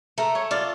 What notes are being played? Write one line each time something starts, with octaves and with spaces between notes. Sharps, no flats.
A3 A#4
C#5
F4 D5